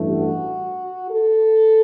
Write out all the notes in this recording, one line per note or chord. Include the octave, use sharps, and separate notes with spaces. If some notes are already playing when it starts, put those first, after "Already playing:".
Already playing: A1 G2 E3 A3
F#4
A4